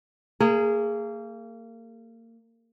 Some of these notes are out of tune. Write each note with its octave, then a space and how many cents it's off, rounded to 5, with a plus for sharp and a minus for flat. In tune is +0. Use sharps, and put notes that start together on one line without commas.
A#3 -30 G#4 +0